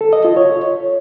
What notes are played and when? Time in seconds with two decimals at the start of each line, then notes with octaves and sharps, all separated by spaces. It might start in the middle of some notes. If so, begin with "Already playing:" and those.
0.01 A4
0.13 D#5
0.25 F4
0.36 C#5